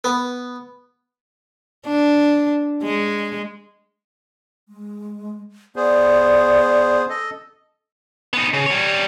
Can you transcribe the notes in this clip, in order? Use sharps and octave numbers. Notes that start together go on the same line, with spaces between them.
B3
D4
G#3
G#3
B3 G#4 C5 D5
A4 D#5
B3 D#4
C#3
G3 C#5